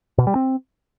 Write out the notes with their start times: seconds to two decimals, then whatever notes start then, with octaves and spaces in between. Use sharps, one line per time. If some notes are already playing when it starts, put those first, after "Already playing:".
0.18 B2
0.27 G3
0.35 C4